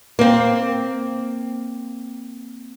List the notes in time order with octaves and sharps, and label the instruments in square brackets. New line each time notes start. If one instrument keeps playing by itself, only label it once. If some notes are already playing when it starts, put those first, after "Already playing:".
[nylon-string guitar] A#3 C4